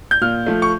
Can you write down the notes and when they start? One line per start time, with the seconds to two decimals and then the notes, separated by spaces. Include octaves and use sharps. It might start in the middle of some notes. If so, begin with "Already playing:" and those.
0.11 G6
0.21 A#2 F6
0.47 F3 A3
0.62 C#6